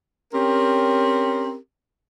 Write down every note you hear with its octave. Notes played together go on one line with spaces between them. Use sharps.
C4 C#4 G4 A#4